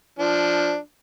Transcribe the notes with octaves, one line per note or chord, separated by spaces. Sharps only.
F3 D4